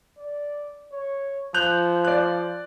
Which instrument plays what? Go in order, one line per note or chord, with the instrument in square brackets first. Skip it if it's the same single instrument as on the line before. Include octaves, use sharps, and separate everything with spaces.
[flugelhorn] D5
C#5
[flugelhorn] F3 [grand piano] F#6 G6 F7
[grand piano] D5 F#6